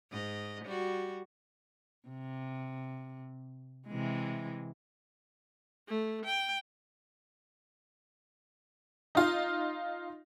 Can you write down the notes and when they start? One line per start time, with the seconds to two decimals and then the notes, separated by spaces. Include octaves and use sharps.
0.11 G#2 D#5
0.64 G3 F#4
2.08 C3
3.88 C3 E3 G#3
5.88 A3
6.25 G5
9.15 D#4 F4